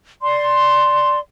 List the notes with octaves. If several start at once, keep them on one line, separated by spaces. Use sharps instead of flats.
D5 C6